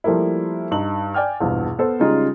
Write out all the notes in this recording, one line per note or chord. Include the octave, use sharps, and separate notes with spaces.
F3 G3 A3 A#3 E4
G2 D#4 F#7
D5 G5 G#5 F6
A#1 E2 G2 B2
B3 A4 C5
C#3 G3 G#3 D#4 F4 G#4